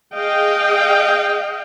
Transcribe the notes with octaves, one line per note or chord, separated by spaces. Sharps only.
G#4 D#5 F5 G5